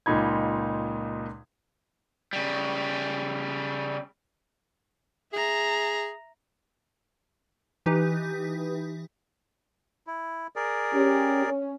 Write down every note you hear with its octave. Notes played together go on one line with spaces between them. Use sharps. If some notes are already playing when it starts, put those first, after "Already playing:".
C#2 A#2 D#4 B5 G#6
C#3 G3
G#4 E5 A#5
E3 D#4 G4 B4
E4
G#4 A#4 D5
C#4 G4
C#4